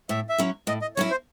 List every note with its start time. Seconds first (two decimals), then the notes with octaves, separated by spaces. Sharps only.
0.09 A2 E5
0.29 E5
0.38 F#3 C#4 E4
0.67 A2 D#5
0.82 D#5
0.96 F#3 C#4 E4 C#5
1.11 C5